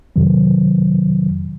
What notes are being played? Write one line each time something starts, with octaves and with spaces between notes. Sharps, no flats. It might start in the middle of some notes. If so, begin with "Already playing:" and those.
F2 C3 D#3 F#3